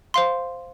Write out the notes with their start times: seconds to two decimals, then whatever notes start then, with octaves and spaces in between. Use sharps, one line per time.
0.14 C5 F5 C6